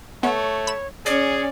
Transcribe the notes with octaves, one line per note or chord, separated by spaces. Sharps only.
A3 B3 C#5
B5 E7
C#4 G#4 D5